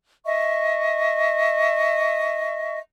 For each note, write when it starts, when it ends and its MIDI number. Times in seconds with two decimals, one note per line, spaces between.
0.25 2.78 75
0.25 2.78 76
0.25 2.78 85